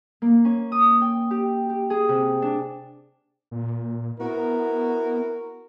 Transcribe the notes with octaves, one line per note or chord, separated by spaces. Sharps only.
A#3
C#4
D#6
G5
G4
G4
G#4
C3
D4
A#2
B3 E4 F#4 A#4